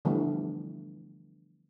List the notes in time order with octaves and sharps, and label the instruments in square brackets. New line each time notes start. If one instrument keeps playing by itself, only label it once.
[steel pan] D3 E3 F3 G3 A3 B3